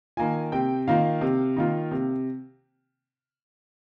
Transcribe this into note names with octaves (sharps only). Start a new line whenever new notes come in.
D#3 A#3 F4 G#5
C3 G5
D#3 A#3 F4 F5
C3
D#3 A#3 F4
C3